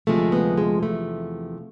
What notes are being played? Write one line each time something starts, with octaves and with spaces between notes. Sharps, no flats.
D2 C3 F3 G#3 A3
B3
G#3
E2 C3 F3 A3